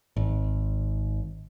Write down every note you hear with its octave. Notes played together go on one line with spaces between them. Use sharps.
G#1